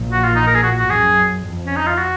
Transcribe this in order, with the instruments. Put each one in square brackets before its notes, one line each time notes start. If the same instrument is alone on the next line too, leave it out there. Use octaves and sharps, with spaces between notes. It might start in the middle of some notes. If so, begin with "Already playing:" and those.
Already playing: [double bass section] A#1 A#2
[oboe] F#4
F4
D#4
A#4
G#4
F#4
F#4
[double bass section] F#2 [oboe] G#4
[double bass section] F2
[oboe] C#4
D#4
F4
F#4